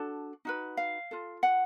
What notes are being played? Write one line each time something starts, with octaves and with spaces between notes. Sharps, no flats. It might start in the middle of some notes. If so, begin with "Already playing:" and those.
Already playing: D4 F#4 A4
D#4 F#4 B4
F5
F4 A4
F#5